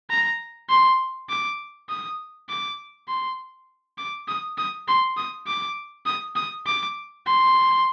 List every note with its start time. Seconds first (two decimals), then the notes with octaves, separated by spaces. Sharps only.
0.10 A#5
0.69 C6
1.29 D6
1.89 D#6
2.49 D6
3.08 C6
3.98 D6
4.28 D#6
4.58 D#6
4.88 C6
5.17 D#6
5.47 D6
6.06 D#6
6.36 D#6
6.67 D6
7.26 C6